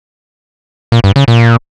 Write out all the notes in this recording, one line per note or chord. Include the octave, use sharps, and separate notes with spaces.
A#2
G2
C#3
A#2